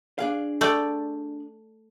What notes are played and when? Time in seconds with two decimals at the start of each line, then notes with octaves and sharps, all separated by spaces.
0.19 D4 G#4 F5
0.61 A3 D5 G5